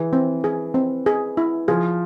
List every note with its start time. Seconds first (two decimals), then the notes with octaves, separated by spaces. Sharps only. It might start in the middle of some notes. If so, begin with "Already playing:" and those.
Already playing: E3 G#4
0.13 C4
0.44 G#4
0.74 C4
1.06 G#4
1.37 E4
1.68 F3 G#4